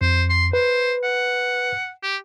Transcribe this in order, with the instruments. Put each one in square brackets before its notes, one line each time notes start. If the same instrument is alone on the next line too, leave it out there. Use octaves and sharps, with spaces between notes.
[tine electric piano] F2 [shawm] C5
[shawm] C6
[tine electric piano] B4 [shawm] C5
[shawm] F#5
G4